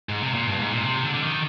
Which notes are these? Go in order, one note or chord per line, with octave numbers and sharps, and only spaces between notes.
G#2
C3
A#2
G2
G#2
A#2
C3
D3
D3
D#3